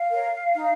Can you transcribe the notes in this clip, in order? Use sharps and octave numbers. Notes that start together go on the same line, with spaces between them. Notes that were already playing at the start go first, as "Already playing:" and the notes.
Already playing: F5
A#4 C#5
D#4